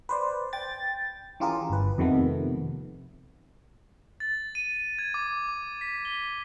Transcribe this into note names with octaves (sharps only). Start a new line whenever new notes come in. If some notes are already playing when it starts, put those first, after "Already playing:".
B4 C5 D5
G5 A6
E3 C#4 F4 G4 G#4 A#4
G1 B4
F2 C3 D#3 A3 B3
A6
D#7
G#6
D6
D6
B6
G7